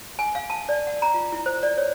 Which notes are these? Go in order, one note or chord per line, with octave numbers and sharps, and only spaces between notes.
G#5
F5
A5
D5
F#5
A#5
F4
E4
C5
D5
C#5